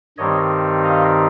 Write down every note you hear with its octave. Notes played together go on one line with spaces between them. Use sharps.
G2 D#3 G3 C4 D#4 C#5 D#5
D#5 F5